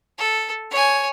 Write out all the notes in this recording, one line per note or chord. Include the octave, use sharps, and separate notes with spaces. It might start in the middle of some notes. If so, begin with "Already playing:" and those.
A4
C#5 G#5